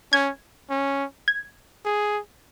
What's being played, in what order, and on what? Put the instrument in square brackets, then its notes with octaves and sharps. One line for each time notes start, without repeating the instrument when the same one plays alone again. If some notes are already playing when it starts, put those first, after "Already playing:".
[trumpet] C#4 [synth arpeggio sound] G#6
[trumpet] C#4
[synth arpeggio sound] G#6
[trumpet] G#4